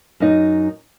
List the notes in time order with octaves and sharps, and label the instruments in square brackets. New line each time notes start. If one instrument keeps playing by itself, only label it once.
[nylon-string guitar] F#2 D#4